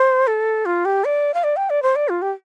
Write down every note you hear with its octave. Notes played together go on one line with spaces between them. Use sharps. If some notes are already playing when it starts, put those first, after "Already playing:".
Already playing: C5
A4
F4
G4
D5
F5
D5
G5
D5
C5
D5
F4
G4